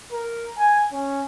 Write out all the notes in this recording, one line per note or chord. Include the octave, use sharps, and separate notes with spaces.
A#4
G#5
C#4